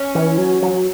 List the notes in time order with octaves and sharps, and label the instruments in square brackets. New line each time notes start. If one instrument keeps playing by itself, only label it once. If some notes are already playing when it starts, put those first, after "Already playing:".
Already playing: [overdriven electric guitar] C#4
[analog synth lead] E3
F#3
F#3